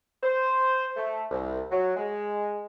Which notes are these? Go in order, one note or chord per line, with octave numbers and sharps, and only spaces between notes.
C5
A3
C2
F#3
G#3